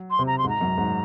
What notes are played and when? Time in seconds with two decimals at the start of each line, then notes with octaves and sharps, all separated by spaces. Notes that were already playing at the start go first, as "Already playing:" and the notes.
Already playing: F#3
0.11 C6
0.19 C3
0.27 A#5
0.38 C6
0.44 G#2
0.49 A#5
0.61 F#2
0.78 G#2